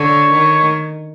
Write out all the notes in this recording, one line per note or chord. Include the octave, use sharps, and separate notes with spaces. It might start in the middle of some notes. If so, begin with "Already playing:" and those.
Already playing: D3 C#5
D#3